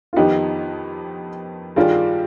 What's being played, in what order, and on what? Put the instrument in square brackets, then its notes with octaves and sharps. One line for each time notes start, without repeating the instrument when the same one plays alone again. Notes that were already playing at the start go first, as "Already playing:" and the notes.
[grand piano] F4
[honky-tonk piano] F2 D#3 B3 [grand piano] D#4 G4
[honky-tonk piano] G2 D#3 G3 D4 G4 [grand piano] F4 G#4